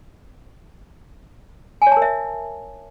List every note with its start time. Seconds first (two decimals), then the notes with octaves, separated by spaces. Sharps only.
1.82 G#5
1.87 C#5
1.92 A5
1.97 A#4
2.02 E5